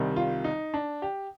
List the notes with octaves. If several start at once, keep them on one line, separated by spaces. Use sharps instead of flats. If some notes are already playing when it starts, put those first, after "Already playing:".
Already playing: C2 C3 D#3 G3
F4
D#4
D4
G4